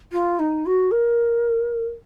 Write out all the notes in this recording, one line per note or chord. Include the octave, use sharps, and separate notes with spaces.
F4
D#4
F#4
A#4